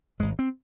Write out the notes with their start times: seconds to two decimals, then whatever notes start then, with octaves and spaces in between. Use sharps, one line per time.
0.20 G#1 G#2 G#3
0.39 C4